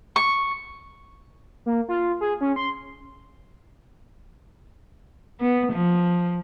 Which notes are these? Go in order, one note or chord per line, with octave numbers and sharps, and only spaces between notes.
C#6
A#3
F4
G#4
C#4
C6
B3
F3